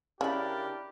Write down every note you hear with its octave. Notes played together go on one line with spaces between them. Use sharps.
C#3 D4 E4 G4 A#4 D5 B5